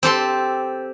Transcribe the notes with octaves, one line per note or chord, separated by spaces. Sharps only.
C4 G4 A4 C6